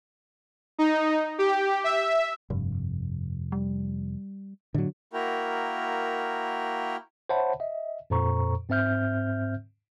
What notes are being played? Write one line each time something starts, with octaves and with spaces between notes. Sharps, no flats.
D#4
G4
E5
F1 G2
G3
A2 D3 F#3
A#3 E4 F#4 A#4 G5
C5 C#5 E5 F#5 A5 B5
D#5 E5
F2 A#2 A4 C5 A#5 C#6
G#2 C4 C5 E5 F6 G6